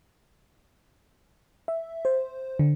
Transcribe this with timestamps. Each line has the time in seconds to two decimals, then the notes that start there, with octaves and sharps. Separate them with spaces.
1.68 E5
2.05 C5
2.59 D3